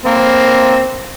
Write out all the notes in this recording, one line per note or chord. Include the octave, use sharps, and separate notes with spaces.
A#3 C4